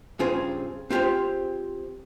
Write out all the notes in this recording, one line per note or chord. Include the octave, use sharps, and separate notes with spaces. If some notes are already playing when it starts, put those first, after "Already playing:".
G2 C#3 C4 F4 G#4 C5
C4 F4 G4 G#4 C5